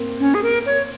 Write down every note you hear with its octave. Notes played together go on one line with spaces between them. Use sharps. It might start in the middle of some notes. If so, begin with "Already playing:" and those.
Already playing: A#3 C4
C#4
G#4
A#4
C#5